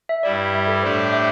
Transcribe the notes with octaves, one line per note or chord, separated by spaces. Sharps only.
E5
G2 G3 E4 D5
E5
A4
A2 A3 D4 G4 C5
E5